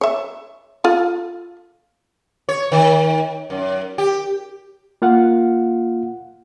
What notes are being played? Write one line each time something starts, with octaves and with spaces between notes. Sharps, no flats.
C#5 E5
F4 A4
C#5
D#3
F#2
G4
A#3 F4 F5 F#5